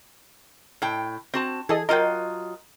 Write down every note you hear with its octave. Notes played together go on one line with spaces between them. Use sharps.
A2 G5
C4 F#4 A5
E3 G#4 A4 D#5
F#3 F4 A#4 D#5 G5